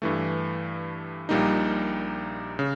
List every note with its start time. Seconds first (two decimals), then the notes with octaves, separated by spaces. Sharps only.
0.02 G2 E3 A3
1.29 A#1 A#2 G3 A#3 D#4
2.59 C#3